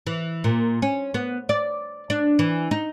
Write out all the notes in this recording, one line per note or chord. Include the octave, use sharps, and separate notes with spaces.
E3
A#2
C#4
B3
D5
D4
E3
D#4